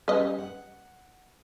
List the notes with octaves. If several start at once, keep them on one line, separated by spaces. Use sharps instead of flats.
G3 C#4 B4 D#5
F#5